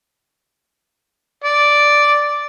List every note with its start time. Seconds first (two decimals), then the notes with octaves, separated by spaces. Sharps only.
1.44 D5